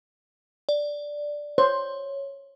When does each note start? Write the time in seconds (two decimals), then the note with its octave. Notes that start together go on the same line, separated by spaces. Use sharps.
0.69 D5
1.58 C5 C#5